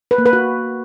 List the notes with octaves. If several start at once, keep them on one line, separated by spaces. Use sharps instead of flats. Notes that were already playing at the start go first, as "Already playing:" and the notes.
B4
A#3
B4
F#4